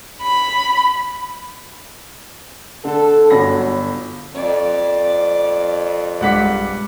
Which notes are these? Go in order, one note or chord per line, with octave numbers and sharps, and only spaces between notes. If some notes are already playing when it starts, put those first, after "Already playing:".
B5
D3 A4
G1 F#3 B5 A#6
F2 D5
B1 G2 G#3 F#5 D6 B6